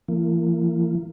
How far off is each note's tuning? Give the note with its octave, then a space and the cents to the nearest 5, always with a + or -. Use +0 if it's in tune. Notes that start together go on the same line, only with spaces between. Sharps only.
E3 +40 A#3 -30